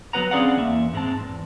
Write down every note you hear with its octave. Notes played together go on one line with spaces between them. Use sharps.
F#3 B3 B4 F#5 A#5
C4 C#4 G#4 D5 F5 F#5
E2 A#3 E5
G#2 G#3 C4 A5
E2